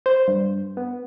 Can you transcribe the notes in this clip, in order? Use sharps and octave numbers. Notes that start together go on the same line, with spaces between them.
C5
G2
B3